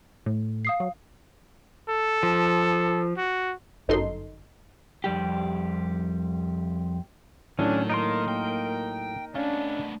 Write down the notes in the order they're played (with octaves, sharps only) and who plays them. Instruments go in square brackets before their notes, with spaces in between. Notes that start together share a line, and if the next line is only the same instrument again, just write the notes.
[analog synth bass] A2
[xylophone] F5 D#6 C7
[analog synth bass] F#3
[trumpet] A4
[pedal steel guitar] F3
[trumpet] F#4
[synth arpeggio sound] G1 F#2 D#4 A4 C6
[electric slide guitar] F2 G3 G4
[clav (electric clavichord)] A2 F#3 [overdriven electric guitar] D#3 [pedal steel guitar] C#4 [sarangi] D4
[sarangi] A#3 [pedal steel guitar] D#4 A#4 C6
[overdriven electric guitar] G5
[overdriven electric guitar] A3 B3 [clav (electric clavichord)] C#4 F5 [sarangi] D4